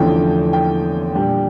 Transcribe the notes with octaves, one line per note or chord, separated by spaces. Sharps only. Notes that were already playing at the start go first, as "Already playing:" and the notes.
Already playing: E2 D3 F3 A3 C#4 G5
G5
A#2 G3 D4